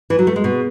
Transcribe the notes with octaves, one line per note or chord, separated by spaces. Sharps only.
E3
F#3
A3
G#3
B2